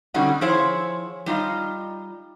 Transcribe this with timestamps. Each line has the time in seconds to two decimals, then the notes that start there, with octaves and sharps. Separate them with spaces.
0.14 B2 D3 G3 C#4 D#4 F#4
0.41 F3 E4 G#4 C5 C#5
1.26 G3 D#4 F4 D#5